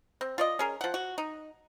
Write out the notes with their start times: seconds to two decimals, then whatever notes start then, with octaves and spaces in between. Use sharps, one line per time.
0.21 C4
0.38 F4 D5 D#5
0.59 C#4 G#4 A#4
0.81 F3 F#5
0.94 F#4
1.18 D#4